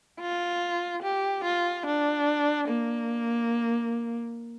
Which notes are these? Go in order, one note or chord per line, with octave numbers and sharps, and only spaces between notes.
F4
G4
F4
D4
A#3